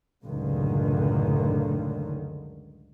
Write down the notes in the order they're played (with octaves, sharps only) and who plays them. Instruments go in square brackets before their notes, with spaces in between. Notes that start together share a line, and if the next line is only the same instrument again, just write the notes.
[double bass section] C#2 F#2 A2 D3 D#3